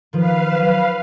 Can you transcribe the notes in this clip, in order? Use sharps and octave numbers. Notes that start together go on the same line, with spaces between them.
D#3 F3 B4 F5
F#3 E7